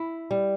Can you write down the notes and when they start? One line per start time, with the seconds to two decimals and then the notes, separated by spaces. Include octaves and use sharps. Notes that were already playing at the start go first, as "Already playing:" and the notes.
Already playing: E4
0.31 G3